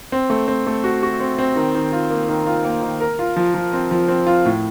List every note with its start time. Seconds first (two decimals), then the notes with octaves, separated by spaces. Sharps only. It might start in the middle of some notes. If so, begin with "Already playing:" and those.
0.12 C4
0.30 A3
0.48 C4
0.67 A3
0.84 F#4
1.03 F#4
1.20 C4
1.39 C4
1.56 D#3
1.75 D#3
1.92 F4
2.10 A#3
2.29 D#3
2.46 F4
2.65 A#3
2.83 D#3
3.01 A#4
3.19 F4
3.36 F3
3.54 F3
3.73 C4
3.91 F3
4.08 C4
4.27 F4
4.46 A2